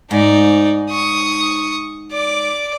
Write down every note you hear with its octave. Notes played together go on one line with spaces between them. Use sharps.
G#2 D#4 D5
C#6 D#6
D5 D6